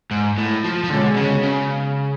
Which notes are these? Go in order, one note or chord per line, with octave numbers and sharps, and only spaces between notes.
G#2
A2
F3
F3
B2 D3 G#3 C#4
C#3
C#3